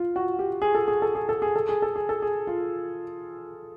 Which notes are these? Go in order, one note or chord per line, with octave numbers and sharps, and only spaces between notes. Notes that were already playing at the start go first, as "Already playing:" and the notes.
Already playing: F4
F#4
G4
G#4
A4
G#4
A4
G#4
A4
G#4
A4
G#4
A4
G#4
A4
G#4
F4